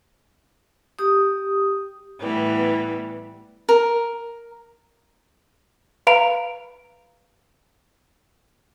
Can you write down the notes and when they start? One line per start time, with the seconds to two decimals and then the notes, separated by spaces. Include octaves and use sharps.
0.99 G4 D#6
2.21 A2 E3 G3 B3
3.69 A#4
6.07 B4 F5 A#5 B5 D7 F7